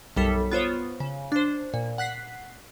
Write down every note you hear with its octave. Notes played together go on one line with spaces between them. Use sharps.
B1 F#2 G3 A4 B6
B3 F4 C5 C#5
C#3
D4 C5
A#2
F#5 F#6 B6 C7